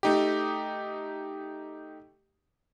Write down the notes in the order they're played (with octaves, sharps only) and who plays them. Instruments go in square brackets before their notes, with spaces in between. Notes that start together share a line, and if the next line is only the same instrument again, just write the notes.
[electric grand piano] A3 D#4 G4